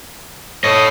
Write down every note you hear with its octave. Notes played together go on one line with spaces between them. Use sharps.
A4 C#5 D#5